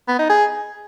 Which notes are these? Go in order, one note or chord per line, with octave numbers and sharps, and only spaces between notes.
B3
D#4
G#4